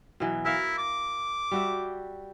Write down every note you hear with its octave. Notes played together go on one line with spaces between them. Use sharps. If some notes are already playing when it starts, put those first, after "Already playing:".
B2 E3 F#3
E4 A#4 E5 F5
D6
G3 F#4 E5